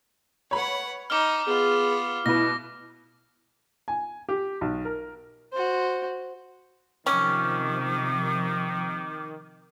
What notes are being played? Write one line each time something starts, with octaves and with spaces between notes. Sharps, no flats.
B4 C#5 F#5 B5
D#4 D6 F6
B3 F4 G#4
B2 E4 B4 A#6
G#5
G4
B1
A#4
F#4 C5
C3 D#3 F3 C#4 D6